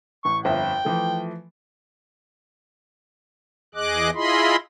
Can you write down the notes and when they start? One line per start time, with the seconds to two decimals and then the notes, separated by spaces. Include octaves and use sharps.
0.25 A1 C#6
0.45 G1 F2 E5 G5
0.85 E3 F3 A3
3.75 E2 G#4 D#5 D6 F#6
4.15 E4 F4 G#4 D#5 B5 C6